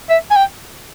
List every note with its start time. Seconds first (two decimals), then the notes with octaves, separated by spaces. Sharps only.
0.09 E5
0.31 G#5
0.36 G5